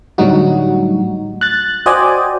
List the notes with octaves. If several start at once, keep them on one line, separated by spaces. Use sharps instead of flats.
A2 D3 F#3 G3 D#4 F#4
F#6 A6
F#4 C5 D5 D#5 G5 G#5